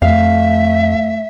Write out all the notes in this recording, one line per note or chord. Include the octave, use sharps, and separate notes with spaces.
F2 A3 E5 F5